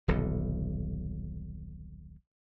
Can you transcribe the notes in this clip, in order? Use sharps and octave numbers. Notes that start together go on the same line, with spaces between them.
D#1 B1 D3